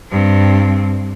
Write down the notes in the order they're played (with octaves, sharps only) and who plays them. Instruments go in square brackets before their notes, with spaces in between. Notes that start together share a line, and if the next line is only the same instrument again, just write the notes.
[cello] G2 C4